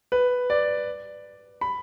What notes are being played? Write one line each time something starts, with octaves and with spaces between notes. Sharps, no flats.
B4
D5
B5